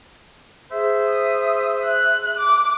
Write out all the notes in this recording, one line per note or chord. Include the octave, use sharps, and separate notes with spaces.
G#4 C5 E5
D#6
F#6
D6